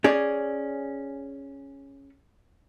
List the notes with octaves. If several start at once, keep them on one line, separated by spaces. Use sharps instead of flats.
C#4 G#4 D5